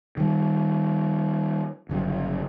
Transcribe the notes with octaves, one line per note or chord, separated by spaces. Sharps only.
D#3 G3
G1 C#3 F#3